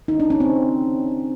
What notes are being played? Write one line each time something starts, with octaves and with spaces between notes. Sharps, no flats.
D#4
D4
C#4
C4